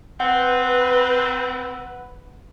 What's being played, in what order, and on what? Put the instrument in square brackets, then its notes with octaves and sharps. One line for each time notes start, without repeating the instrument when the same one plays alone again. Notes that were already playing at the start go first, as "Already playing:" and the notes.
[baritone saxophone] C4 [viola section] B4 [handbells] F#5